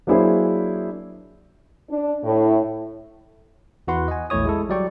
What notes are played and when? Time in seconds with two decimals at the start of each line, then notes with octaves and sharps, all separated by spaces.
0.07 F#3 A#3 D4 E4 G#4 C5
1.89 D4
2.24 A2
3.88 E2 E4 F#4 B4 F#5 C6
4.08 D#5 G#5
4.30 A#1 E2 A3 E4 C#5 D#6
4.45 G#3 E4 A4
4.69 F#3 G3 D5 G5 C#6